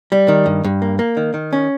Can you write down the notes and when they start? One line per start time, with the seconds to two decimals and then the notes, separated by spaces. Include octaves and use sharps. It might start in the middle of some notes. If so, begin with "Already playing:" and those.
0.12 G3
0.28 D#3
0.46 G2
0.64 G2
0.82 A#3
0.99 A#3
1.17 D#3
1.34 D#3
1.53 C#4